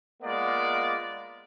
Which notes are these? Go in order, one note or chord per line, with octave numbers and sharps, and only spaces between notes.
G#3 A#3 B3 F4 D5